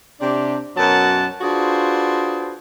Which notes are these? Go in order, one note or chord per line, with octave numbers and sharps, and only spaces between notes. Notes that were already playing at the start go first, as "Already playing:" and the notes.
C3 D4 G4
F#2 B2 F#3 A#4 F#5 A5
D4 F4 F#4 G#4 B4 C5